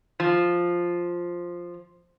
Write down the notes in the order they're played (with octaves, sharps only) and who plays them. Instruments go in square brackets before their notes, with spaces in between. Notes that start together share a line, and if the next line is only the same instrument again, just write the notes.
[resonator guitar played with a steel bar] F3